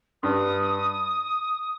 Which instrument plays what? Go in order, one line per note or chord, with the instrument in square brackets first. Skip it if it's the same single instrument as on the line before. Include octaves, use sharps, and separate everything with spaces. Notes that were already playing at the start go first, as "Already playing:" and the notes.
[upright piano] G2 [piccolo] D#6